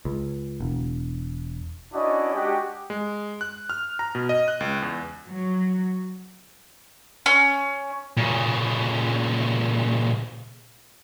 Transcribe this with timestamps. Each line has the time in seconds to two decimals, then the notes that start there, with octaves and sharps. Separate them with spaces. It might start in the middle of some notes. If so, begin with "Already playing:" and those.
0.05 C#2
0.60 E1
1.94 C#4 D4 E4 F#4 D5 D#5
2.34 G#3 D4 F#4 G4
2.90 G#3
3.41 F#6
3.70 F6
3.99 A#5
4.15 B2
4.29 D#5
4.48 F#6
4.60 C#2
4.82 E2
5.28 F#3
7.26 C#4
8.17 A#2 C#3